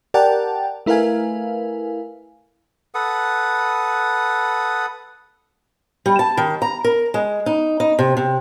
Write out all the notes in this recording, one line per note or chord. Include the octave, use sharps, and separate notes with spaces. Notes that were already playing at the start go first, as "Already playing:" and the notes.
G4 A#4 D5 F#5 G5 A5
A3 E4 A#4 B4 F5 G#5
A4 B4 F#5 D#6
G3
A5
D#3
A#5
A#4
G#3
D#4
D#4
C3
C3